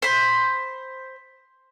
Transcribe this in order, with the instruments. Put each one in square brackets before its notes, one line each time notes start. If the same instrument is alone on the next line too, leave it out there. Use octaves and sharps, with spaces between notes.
[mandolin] C5 B5